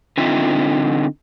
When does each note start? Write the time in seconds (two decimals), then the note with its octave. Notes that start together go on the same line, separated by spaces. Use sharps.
0.18 D3 C4 D#4 F4 E5